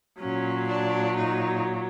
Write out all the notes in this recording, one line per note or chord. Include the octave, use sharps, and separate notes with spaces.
A#2 F#3 C#4
D4
D#4